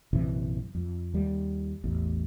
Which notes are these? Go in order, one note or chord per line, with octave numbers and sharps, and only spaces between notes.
A#1 F#2 C3 E3
F2
D#2 G3
A1 E2